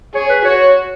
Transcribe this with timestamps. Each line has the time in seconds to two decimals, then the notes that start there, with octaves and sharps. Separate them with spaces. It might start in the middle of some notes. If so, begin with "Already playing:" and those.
0.14 G#4 C#5
0.29 B4
0.44 F#4 C#5